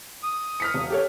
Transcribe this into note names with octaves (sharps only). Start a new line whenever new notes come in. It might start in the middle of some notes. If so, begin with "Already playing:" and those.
D#6
F6 B6 C#7
E1
G4 A4 C#5